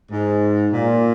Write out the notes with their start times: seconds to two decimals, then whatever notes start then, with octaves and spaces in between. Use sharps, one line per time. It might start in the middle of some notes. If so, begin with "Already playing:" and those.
0.12 G#2
0.72 A#2